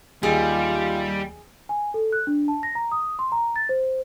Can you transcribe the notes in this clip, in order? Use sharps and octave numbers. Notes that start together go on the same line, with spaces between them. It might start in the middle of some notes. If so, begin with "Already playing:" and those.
D#2 G3 F4 G#4
G#5
A4
F#6
D4
A5
A#6
A#5
D#6
C6
A#5
A6
C5